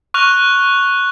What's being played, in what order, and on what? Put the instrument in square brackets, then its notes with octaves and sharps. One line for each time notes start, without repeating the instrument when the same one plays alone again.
[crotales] C#6 F6 F#6 F7